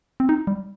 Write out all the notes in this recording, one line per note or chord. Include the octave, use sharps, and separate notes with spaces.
C4
D#4
G3